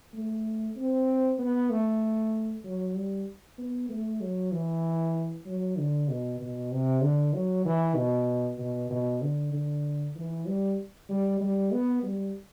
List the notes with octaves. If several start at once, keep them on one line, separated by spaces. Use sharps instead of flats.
A3
C4
B3
A3
F#3
G3
B3
A3
F#3
E3
F#3
D3
B2
B2
C3
D3
F#3
E3
B2
B2
B2
D3
D3
E3
G3
G3
G3
B3
G3